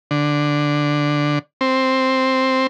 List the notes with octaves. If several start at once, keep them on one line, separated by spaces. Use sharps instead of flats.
D3
C4